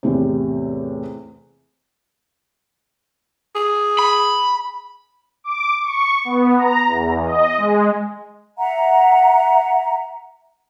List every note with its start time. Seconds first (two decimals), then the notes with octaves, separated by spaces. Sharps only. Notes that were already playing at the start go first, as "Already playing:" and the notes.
0.03 E2 A2 C3
3.55 G#4
3.99 B5
5.44 D6
5.83 C#6
6.25 B3
6.58 A#5
6.87 E2
7.26 D#5
7.58 G#3
8.58 E5 F#5 A#5